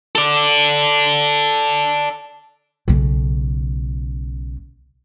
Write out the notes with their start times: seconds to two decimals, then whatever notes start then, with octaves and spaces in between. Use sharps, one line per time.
0.15 A4 D5
2.88 B1 C#3